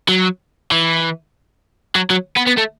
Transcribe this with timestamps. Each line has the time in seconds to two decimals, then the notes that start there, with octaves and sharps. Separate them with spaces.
0.09 F#3
0.72 E3
1.96 F#3
2.11 F#3
2.37 B3
2.47 B3
2.58 A3